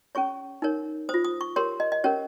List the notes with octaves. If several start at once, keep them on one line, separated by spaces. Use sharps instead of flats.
C#4 G#4 C#5 C#6
D#4 A#4 C#5
C5 D#6
F4
D#6
C#6
G4 A#4 C#5 C6
D#5
D#5
C#4 G4 A#4 C#5